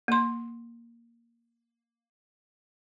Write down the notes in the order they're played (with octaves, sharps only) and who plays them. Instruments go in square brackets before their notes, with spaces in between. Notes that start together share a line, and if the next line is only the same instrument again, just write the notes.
[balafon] A#3 C6